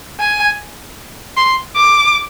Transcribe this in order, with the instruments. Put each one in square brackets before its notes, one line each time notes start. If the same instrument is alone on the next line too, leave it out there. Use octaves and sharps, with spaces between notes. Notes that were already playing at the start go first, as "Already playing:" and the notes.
[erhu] G#5
C6
D6